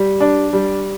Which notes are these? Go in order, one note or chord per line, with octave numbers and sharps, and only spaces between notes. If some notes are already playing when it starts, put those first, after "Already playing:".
Already playing: G3
D4
G3